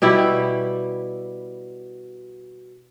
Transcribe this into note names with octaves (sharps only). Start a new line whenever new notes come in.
B2 G3 E4 G4